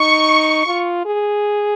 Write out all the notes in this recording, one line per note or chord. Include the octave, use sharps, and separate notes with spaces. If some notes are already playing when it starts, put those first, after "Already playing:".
Already playing: D#4 C#6
F4
G#4